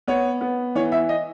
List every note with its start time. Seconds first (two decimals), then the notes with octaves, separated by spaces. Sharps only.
0.07 B3 C#5
0.41 B3
0.75 E3 C#5
0.92 E5
1.09 D#5